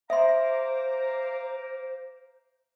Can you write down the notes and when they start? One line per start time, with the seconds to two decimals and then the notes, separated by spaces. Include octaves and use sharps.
0.10 C5 E5 F5 A#5 C6 D6